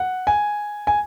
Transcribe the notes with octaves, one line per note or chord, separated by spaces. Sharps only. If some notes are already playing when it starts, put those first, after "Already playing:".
Already playing: F#5
G#5
G#5